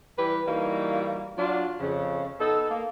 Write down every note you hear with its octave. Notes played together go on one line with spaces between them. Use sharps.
E3 G3 G4 B4
E3 G3 A#3 D#4 F#4
F#3 D4 F4
F2 C#3
B3 D#4 A4
A#3